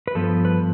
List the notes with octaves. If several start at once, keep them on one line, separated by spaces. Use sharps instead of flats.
B4
G2 F3 B3 A4
B4